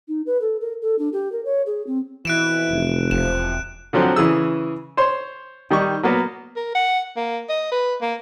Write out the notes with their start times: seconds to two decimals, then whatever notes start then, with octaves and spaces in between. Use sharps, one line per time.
0.08 D#4
0.26 B4
0.41 A4
0.60 A#4
0.81 A4
0.98 D4
1.12 G4
1.32 A#4
1.45 C#5
1.66 G#4
1.86 C4
2.25 F2 B2 E3 E4 F#6 D7 E7
2.71 F1
3.11 E1 C3 F3 E7
3.93 D3 F3 F#3 C4
4.16 C#3 E3 G#4 E6
4.97 C5 C#5 C6
5.70 D#3 G3 D#4 C#6
6.03 F#3 A#3 B3
6.56 A#4
6.75 F#5
7.17 A#3
7.50 D#5
7.72 B4
8.01 A#3